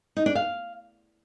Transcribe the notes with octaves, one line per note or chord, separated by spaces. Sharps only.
D#4
D4
F5